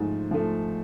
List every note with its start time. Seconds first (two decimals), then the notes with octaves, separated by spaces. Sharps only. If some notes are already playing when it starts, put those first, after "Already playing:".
Already playing: G#2 F3 A3
0.31 F3 A3